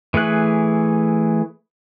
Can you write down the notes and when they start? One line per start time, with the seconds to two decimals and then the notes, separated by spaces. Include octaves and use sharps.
0.14 E3 A3 G#4 F#6